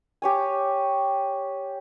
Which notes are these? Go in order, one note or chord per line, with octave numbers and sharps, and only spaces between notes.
G4 C#5 G#5